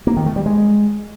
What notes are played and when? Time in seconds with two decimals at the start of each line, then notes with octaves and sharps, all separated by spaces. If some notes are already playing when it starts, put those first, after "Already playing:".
0.07 A#3
0.17 D#3
0.26 A3
0.36 G3
0.46 G#3